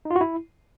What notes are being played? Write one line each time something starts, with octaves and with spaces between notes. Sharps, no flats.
D#4
F4
F#4
E4